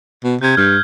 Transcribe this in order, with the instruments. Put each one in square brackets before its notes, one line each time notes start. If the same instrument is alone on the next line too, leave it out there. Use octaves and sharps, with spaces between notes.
[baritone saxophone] B2
[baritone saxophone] C3 [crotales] G6 G#6
[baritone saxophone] G2 [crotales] F6 G6